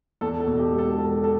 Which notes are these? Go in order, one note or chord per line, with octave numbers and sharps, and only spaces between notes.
E2 A4
A4
B2
G4
E1
A4
E1 A4
A4